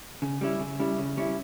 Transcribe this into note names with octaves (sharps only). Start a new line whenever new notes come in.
C#3
G3 C#4 E4
C#3
G3 C#4 E4
C#3
G3 C#4 E4